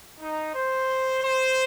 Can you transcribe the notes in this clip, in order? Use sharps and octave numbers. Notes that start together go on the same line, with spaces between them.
D#4
C5
C5